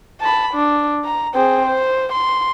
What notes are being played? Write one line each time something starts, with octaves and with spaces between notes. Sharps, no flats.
A5 B5
D4
A#5
C4 G#4
C5
C6